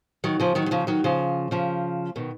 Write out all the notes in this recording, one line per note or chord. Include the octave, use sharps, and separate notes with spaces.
D#3 F#3
C#3 F3
D#3 F#3
D#3
C#3 F3
D#3 F#3
C#3 F3
C#3 F3
B2 D#3